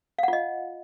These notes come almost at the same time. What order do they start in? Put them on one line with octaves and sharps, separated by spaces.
F5 F#5 F4 D#5